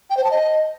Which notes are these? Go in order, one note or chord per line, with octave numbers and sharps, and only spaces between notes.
G5
C5
A5
D#5